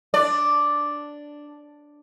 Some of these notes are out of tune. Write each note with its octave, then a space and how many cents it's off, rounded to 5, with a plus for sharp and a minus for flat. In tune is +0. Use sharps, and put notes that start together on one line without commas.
D4 +0 D5 +0